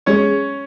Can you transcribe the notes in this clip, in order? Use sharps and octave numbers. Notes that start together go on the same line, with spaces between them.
G#3 C#4 C#5